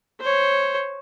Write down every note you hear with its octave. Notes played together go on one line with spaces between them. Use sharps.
C5 C#5